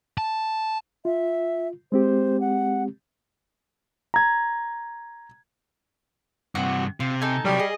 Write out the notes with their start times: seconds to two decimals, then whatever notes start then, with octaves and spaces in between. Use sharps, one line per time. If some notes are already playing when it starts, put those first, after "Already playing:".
0.18 A5
1.05 F4 E5
1.92 G#3 C4 G4 C5
2.41 F#5
4.14 A#5 G#6
6.55 G2 C3 F#4
7.00 C3 F4
7.22 D#4 A4 G#5
7.45 C3 F#3 G3
7.59 G#4 D#5